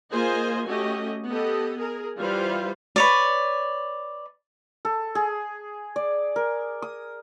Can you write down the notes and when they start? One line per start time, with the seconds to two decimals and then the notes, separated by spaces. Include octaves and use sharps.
0.12 A#3 F4 G#4 C5 D#5 G#5
0.66 A3 C#4 F#4 G4 D#5
1.28 B3 G4 A4 D#5
1.77 G#4 A#4
2.18 E3 G3 F4 B4 C5 F5
2.96 B4 C#5 D5
4.85 A4
5.15 G#4
5.96 D5
6.36 A#4
6.82 D#6